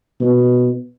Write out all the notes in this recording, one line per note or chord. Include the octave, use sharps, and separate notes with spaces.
B2